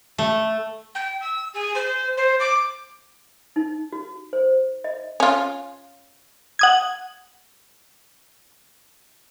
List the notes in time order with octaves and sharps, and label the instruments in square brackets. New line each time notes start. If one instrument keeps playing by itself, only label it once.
[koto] A3
[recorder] G5
E6
G#4
C5
C5
D6
[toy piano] D#4
F#4
C5
D#5
[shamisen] C#4 F4
[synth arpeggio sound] F#5 D#6 G#6